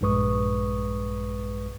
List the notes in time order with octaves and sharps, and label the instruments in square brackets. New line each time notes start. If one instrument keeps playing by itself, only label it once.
[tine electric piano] A#1 G2 G#3 B4 C#6 D#6